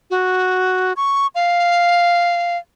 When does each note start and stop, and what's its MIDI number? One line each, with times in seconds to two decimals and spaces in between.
0.11 0.93 66
0.97 1.27 85
1.35 2.57 77